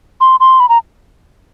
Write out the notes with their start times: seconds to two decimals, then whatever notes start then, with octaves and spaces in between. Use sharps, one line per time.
0.21 C6
0.40 C6
0.60 B5
0.69 A#5